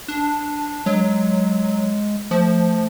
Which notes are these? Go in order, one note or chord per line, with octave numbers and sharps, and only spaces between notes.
D4
F#3 G#3
F3 A3